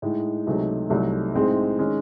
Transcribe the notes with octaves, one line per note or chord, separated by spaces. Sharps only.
A2 G#3 D#4
C#2 C3 F#3 A3 D#4
C2 C3 F#3 A3 D#4
A2 G#3 C4 D#4 G#4
D#3 G#3 C#4